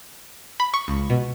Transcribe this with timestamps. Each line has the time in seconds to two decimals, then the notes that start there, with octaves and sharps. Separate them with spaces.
0.60 B5
0.74 C#6
0.88 C#2
1.10 B2